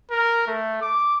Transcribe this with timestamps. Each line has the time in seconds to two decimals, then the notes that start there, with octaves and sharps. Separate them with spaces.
0.10 A#4
0.47 A3
0.82 D6